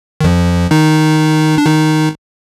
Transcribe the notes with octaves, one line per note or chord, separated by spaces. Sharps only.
D#3
F2 F3
D#3 D#4
D4
D#3 D#4